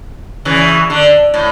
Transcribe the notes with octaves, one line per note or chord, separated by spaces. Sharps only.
C#3 E3
D3
A2